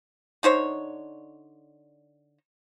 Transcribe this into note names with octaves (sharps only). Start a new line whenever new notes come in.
D3 D#4 C5 C#5